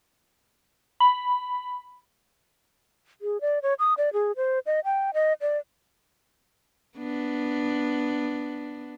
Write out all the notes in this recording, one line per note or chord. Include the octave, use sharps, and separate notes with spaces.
B5
G#4
D5
C#5
D#6
D5
G#4
C5
D#5
G5
D#5
D5
B3 D4